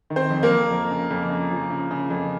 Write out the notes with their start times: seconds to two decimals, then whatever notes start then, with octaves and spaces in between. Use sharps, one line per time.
0.10 D#3
0.16 C4 C5
0.30 F2
0.43 A#3 A#4
0.50 F2
0.70 F2
0.90 C#3
1.10 F2
1.30 C#3
1.51 F3
1.70 C#3
1.91 C#3
2.10 F2